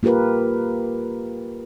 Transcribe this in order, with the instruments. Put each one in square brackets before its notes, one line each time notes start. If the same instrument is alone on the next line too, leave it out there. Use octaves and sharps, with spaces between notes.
[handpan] A#3 F4 G4 A#4 B4